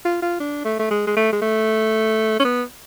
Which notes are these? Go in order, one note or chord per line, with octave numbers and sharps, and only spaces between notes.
F4
F4
D4
A3
A3
G#3
G#3
A3
G#3
A3
C#4
B3